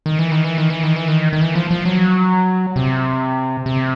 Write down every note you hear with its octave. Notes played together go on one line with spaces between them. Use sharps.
D#3
E3
D#3
E3
D#3
E3
D#3
E3
D#3
D#3
E3
F3
F3
F#3
C3
C3